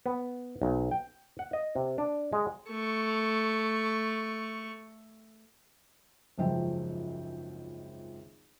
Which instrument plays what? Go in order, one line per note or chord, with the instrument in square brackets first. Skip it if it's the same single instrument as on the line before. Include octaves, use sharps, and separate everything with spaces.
[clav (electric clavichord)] B3
B1
G5
F#5
D#5
C3
D4
G#3
[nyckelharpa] A3 C#6
[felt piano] G#1 C#2 F#2 F3 E5 G5